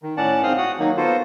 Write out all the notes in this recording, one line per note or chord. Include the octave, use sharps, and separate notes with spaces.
D#3
A2 C#4 D5 F#5 A5
G#2 C4 F5 G5 D#6 F6
F#4 F#5 D#6
D#3 F#3 A#3 D#4
B3 F4 F#4 A4 C5